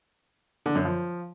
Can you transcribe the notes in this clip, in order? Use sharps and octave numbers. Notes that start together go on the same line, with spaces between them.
D3
F#2
F3